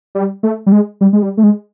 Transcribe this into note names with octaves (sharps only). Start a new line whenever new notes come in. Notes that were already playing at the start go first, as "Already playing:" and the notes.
G3
A3
G3
G#3
G3
G#3
G3
A3
G#3